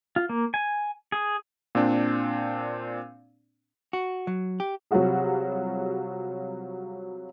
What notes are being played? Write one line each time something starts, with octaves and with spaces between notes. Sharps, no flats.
F4
A#3
G#5
G#4
A#2 C4 D4
F#4
F#3
G4
C3 F#3 G3 F4 F#4 G#4